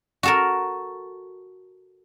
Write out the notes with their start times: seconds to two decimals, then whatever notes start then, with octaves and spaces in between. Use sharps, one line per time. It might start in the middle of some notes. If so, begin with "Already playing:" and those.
0.23 F#4 A4 A#4